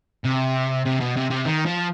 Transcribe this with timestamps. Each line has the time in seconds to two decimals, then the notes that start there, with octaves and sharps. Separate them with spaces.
0.25 C3
0.86 C3
1.01 B2
1.16 C3
1.30 C3
1.46 D#3
1.66 F3